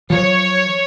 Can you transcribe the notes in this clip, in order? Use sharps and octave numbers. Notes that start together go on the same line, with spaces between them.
F3 F#3 C#5